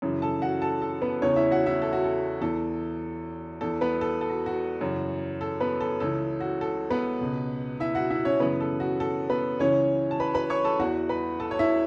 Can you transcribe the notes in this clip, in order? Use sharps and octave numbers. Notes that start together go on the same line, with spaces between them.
F#2 C#3 E3
A4 A5
F#4 F#5
A4 A5
A4
B3 B4
E2 C#3 E3 C#4 C#5
E4 E5
F#4 F#5
E4 E5
A4
F#4
A4
E2 E3 A4
E2 E3 A4
B3 B4
A4
A4
F#4
F#4
F#2 C#3 E3
A4
B3 B4
A4
C#2 C#3 E3 A4
F#4
A4
B3 B4
C#2 B2
E4 E5
F#4 F#5
E4 E5
C#4 C#5
F#2 C#3 E3 B3 B4
A4
F#4
A4
B3 B4
C#2 C#3 E3 C#4 C#5
A5
B4 B5
B4 B5
C#5 C#6
A4 A5
E2 E3 F#4 F#5
B4 B5
A4 A5
C#5
E4 E5